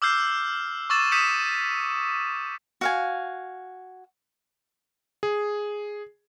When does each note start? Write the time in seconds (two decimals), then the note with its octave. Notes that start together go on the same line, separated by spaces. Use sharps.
0.02 D6 E6 F6 G6 C7
0.90 C#6 D6 E6 A6 E7
1.12 D#6 G6 B6 C#7 D#7 E7
2.81 F#4 F5 G#5
5.23 G#4